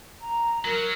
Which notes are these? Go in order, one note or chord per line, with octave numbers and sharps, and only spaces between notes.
A#5
F#3 A#4